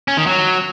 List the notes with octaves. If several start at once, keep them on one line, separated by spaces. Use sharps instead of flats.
C#4
D#3
F#3